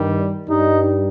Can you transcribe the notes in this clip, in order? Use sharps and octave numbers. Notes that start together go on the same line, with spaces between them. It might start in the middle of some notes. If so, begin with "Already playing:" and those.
Already playing: G2 D#3 G3
G2 G3 D#4